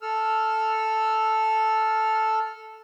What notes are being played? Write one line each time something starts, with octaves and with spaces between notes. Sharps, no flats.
A4 E6 F6